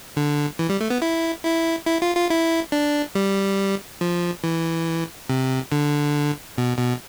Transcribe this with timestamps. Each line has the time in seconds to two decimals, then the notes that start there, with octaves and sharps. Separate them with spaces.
0.17 D3
0.59 E3
0.69 G3
0.80 A3
0.90 B3
1.02 E4
1.45 E4
1.87 E4
2.02 F4
2.16 F4
2.30 E4
2.72 D4
3.15 G3
4.01 F3
4.44 E3
5.30 C3
5.72 D3
6.58 B2
6.78 B2